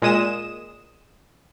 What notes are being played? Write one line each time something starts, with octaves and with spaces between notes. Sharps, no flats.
A#2 G#3 D#6 E7